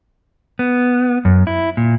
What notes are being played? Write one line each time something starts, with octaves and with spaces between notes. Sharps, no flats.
B3
F#2
E4
A#2